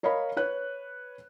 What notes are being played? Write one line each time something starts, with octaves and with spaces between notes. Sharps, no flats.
A#4 C#5 D#5 F5 B5
B4 C#5 F#6